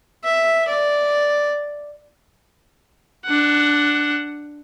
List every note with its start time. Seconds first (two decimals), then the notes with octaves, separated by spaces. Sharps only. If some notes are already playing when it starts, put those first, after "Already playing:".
0.24 E5
0.68 D5
3.26 D4 F#5